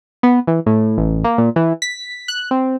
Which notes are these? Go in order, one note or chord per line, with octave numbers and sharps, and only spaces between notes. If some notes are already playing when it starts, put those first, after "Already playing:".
B3
E3
A2
A1
A#3
A#2
E3
B6
F#6
C4